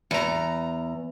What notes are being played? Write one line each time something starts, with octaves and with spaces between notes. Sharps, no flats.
E2 A#5